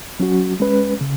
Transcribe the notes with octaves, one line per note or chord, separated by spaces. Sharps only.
F#3 C#4 F#4
G#3 C#4 B4
C#3